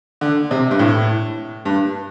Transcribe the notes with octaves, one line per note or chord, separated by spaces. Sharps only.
D3
C3
G2
A2
G2